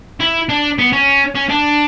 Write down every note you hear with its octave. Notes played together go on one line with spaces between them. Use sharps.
E4
D4
B3
C#4
C#4
D4